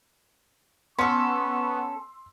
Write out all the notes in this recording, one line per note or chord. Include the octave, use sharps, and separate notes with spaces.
B3 C#4 A4 C6 C#6 E6